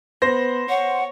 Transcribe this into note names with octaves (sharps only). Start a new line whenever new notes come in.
B3 C5 A#6
C#5 F#5